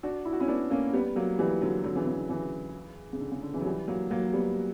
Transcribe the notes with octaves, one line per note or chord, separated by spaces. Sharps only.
D4 F#4
E4
F#4
C#4 E4
B3 D4
A#3 C#4
G3 B3
F#3 A#3
E3 G3
D3 F#3
D3 F#3
C#3 E3
C#3
D3
C#3 E3
C#3
D3
C#3
D3
C#3 E3
F#3
E3 G3
F#3 A#3
F#3 A#3
G3 B3